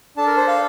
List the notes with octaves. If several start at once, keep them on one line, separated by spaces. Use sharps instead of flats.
D4 A4 A5
A#4
C5
F5